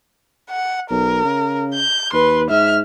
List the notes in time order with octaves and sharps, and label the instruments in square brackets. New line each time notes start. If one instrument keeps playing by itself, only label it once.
[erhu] F#5
[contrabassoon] B1 [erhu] A#4
[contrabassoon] C#3
[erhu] G6
[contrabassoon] D#2 [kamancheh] B4 [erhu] C6
[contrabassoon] G#2 [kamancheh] E5 [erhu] F6